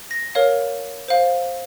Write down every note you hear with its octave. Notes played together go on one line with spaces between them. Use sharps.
A#6
A#4 C#5 F5
C5 F5